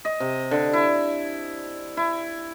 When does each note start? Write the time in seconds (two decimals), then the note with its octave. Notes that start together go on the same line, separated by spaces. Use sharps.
0.05 D#5
0.20 C3
0.51 D3
0.73 E4
1.97 E4